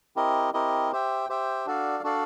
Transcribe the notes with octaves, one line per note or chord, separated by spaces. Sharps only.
C4 E4 G4 A#4 D#5
C4 E4 G4 A#4 D#5
G4 C5 E5 G5
G4 C5 E5 G5
D4 F#4 A4 D5 F5
D4 F#4 A4 D5 F5